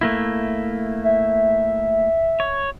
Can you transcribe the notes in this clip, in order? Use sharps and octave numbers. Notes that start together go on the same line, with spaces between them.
A3 A#3 E4
E5
C#5